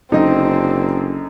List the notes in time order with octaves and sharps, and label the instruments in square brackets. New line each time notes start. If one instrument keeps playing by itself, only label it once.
[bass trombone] F#1 [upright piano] F#2 D3 D#5 [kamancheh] C4 D4 [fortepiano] D#4